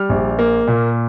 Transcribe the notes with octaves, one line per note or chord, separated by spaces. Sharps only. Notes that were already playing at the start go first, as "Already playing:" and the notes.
Already playing: G3 F6
A#1
A#3
A#2